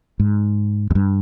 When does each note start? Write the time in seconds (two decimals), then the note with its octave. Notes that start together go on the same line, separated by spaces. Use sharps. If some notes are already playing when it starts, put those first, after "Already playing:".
0.20 G#2
0.91 F2
0.95 G2